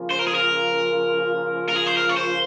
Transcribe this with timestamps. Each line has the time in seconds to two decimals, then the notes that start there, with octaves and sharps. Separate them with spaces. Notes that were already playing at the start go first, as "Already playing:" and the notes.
Already playing: C#3 F3 A#3 F4
0.11 C5
0.19 A#4
0.27 G#4
0.35 A#4
1.69 A#4
1.76 G#4
1.86 C5
1.97 A#4
2.09 C#5
2.17 C5